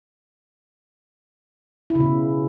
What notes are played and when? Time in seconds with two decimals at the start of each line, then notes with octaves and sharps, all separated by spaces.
1.90 E4
1.95 C#3
2.00 B2